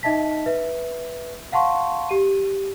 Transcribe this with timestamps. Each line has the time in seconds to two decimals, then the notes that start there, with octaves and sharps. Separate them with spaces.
0.03 D#4 D#5 E5 A5 B6
0.46 B4 E5
1.52 F5 F#5 A5 C6 C#6
2.09 G4 D#7